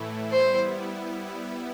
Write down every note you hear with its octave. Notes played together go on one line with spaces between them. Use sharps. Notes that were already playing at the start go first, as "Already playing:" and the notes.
Already playing: A2 E3 A3 E4
G3 B3 E4 C5